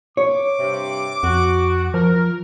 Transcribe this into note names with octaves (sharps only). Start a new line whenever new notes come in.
C#5 D6
G2 C3
F2 F#4
F3 A#4